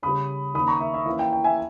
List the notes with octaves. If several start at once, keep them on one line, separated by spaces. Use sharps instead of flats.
C#3 G3 C#4 B5 D#6
D#3 A#3 C#4 B5 D#6
A#5 C#6
E5
E5
E3 A#3 C#4 E5
G5
G5
E5 G#5